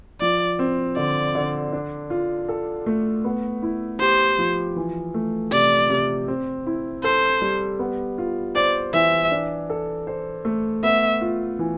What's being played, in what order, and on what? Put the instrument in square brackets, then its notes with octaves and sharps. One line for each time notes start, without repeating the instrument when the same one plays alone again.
[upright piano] F3 [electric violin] D5
[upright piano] C4
[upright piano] D3 [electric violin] D5
[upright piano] D3
D4
F4
A4
A3
B3
E4
[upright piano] G4 [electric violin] C5
[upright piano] F3
E3
A3
[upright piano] C3 [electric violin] D5
[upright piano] C3
C4
E4
[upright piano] A4 [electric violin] C5
[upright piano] G3
B3
F4
[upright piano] C5 [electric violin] D5
[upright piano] E3 [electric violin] E5
[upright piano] D4
A4
C5
A3
[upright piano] B3 [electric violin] E5
[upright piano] F4
E3